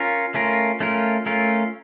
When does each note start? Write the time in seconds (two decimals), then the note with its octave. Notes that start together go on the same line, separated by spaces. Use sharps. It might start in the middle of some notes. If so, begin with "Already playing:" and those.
Already playing: C#4 F4 A#4
0.34 A3 C#4 F4 A#4
0.80 A3 C#4 F4 A#4
1.26 A3 C#4 F4 A#4